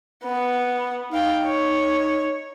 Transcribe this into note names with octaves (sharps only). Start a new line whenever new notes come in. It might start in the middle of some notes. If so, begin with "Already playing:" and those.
B3
D#4 F5 G5
C#5